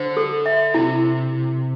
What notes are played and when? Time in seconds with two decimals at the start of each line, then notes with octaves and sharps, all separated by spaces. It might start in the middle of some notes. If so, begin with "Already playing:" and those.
Already playing: D3 C5
0.17 A4
0.46 E5
0.74 C3 E4